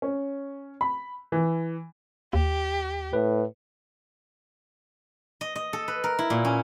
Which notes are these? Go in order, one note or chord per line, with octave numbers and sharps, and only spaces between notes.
C#4
B5
E3
D#2 G4
A2 B4
D#5
D#5
A4
B4
A#4
E4
A#2
C#4